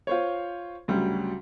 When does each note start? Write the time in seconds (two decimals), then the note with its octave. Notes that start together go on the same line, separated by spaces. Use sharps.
0.07 F4 C5 C#5
0.88 D2 C#3 F#3 G3